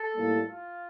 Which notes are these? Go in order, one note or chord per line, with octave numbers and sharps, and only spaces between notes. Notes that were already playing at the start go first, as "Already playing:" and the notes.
Already playing: A4
A2 G3 A#3
F4